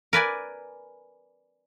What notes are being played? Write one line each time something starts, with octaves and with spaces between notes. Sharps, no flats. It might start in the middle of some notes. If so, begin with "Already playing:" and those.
A#4 B4 D5 G#5